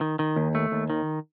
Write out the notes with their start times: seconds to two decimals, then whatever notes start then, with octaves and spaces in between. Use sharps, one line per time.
0.01 D#3
0.19 D#3
0.36 D#2
0.55 A3
0.72 D#2
0.90 D#3